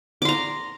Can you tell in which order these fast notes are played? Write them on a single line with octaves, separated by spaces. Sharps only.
D6 C6 A#5